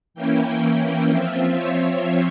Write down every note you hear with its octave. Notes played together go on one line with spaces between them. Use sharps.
E3 A#3 C#4 E4 G5
F3 C4 F4 E5
C#5